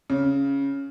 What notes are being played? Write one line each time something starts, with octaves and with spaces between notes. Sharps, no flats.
C#3